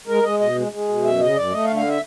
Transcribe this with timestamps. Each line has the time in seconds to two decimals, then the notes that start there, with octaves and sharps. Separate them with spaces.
0.07 G#3 A#4
0.23 G#3 D#5
0.39 B2 D#5
0.55 G#3
0.72 G#3
0.88 B2
1.04 F#2 E5
1.20 C#3 D#5
1.36 F#2 D5
1.52 A3 D#5
1.65 F5
1.69 D3
1.76 F5
1.88 E5